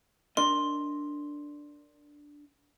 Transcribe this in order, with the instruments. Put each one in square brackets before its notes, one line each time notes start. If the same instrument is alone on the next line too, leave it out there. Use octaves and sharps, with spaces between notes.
[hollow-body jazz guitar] D4 A#4 D#5 [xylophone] C6